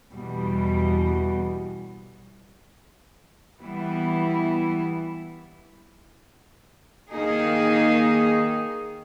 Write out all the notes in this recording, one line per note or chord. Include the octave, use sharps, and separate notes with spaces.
E2 B2 G3
E3 G3 B3 E4
D#3 A#3 D#4 G#4